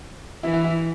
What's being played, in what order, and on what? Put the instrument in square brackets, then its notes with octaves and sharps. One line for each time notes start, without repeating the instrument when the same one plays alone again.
[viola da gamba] E3 [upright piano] E4
[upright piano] E4
E4